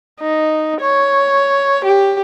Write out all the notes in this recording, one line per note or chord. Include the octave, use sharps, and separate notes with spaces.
D#4
C#5
G4